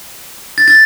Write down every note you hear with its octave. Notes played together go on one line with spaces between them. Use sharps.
A6
A6